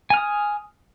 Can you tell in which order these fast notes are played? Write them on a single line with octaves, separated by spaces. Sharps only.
G#5 F6 D#6